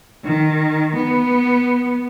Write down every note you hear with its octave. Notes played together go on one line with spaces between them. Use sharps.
D#3
B3